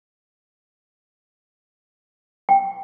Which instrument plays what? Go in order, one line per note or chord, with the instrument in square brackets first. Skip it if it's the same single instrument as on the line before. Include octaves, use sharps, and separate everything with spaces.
[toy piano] G5